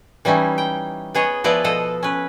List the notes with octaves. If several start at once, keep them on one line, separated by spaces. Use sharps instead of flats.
E3 G3 C#4 D#4 E4
G5
B3 G#4 C#5 D#5
F3 B3 E4 D5 D#5
B2 F3 A4 D#5
C#4 B4